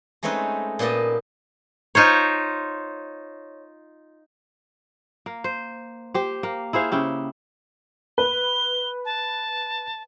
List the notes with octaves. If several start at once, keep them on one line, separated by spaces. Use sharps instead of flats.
G#3 A3 C4 C#4 D#4 B4
A#2 B3 G4 D#5 A5
D#4 F4 C5 C#5
A#3
C5
G4 C5
A#3
E4 G#4 C5 F5
C#3 E4 G4
B4 G7
A5